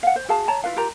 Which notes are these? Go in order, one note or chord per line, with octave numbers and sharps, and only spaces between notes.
F5 F#5
C5
F#4 G#4 F5 A5
C#5 A5 A#5
E4 F4 B4 F5
F4 G4 A#4 A#5